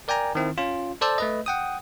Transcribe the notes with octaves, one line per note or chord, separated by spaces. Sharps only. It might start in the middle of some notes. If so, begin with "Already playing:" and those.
A#4 D5 G5 G#5 A#5
D#3 C4 E4
C#4 F4
A4 C5 D5 A5 E6
A3 B4 D#5
F#5 G5 D#6